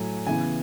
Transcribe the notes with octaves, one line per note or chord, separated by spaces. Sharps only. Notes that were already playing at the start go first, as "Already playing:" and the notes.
Already playing: A2 F#3 A3 G#5
C#3 E3 B3 G#5